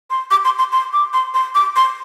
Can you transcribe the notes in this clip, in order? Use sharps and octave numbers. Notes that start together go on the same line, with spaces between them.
C6
D6
C6
C6
C6
D6
C6
C6
D6
C6